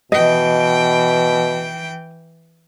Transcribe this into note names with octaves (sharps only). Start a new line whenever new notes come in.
B2 E3 D#5 G5